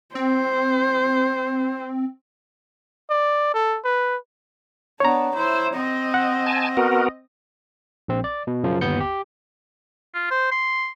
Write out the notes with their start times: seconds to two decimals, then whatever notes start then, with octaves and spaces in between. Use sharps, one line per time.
0.15 C4 C5
3.10 D5
3.54 A4
3.84 B4
5.00 B3 D4 C#5 A#5
5.35 E4 C5
5.74 C4 D#5
6.14 F#5
6.46 G#5 A5
6.77 B3 F#4 A#4
8.08 A#1 C4
8.24 D5
8.47 B2
8.64 F#2 C#3 F3
8.81 G1 D#2 B3 G6 C#7
9.00 G4
10.14 F4
10.31 C5
10.52 C6